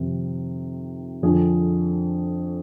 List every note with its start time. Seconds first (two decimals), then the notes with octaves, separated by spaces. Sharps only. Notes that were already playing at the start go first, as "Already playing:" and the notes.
Already playing: F2 C3 D#3
1.23 F2 D3 F3 G#4